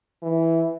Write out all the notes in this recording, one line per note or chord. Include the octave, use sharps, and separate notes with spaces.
E3